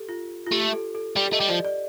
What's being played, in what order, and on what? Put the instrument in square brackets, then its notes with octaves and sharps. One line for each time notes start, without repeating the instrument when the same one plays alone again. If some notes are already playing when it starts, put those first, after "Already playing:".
Already playing: [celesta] G4 A4
F4
F4
[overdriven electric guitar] A3 [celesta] G4
[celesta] A4
A4
[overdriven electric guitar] G3 [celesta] G4
[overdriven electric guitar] A3 [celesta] D#5
[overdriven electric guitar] G3
[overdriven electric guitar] F3 [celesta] D5
[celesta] D5